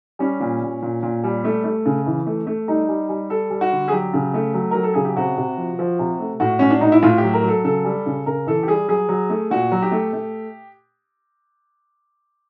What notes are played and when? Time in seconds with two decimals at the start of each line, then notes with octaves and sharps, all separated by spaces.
0.19 G3 C#4
0.40 A#2
0.61 A#2
0.82 A#2
1.03 A#2
1.24 G3
1.44 A3
1.64 A3
1.85 C#3
2.06 E3
2.26 A3
2.47 A3
2.68 G3 D#4
2.89 G3
3.09 G3
3.30 G3 A4
3.50 G3
3.61 F#4
3.72 D3
3.88 G#4
3.92 F#3 G4
4.13 C#3
4.34 A3
4.54 F#3
4.71 F#3 A#4
4.83 A4
4.94 C#3 G#4
5.05 G4
5.16 C3 F#4
5.37 C3
5.57 F3
5.79 F3
5.99 C3
6.20 A3
6.40 A2 F#4
6.59 A2 C#4
6.70 D4
6.81 A2 D#4
6.92 E4
7.03 A2 F4
7.18 G4
7.24 F#3
7.34 A#4
7.43 F#3
7.48 A4
7.64 C#3 A4
7.85 G3
8.06 C#3
8.26 C#3 A#4
8.47 E3 A4
8.63 G4
8.68 G3 G#4
8.88 F#3 G#4
9.09 F#3
9.30 A3
9.51 A#2 F#4
9.72 F#3
9.82 G4
9.91 A3
10.13 A3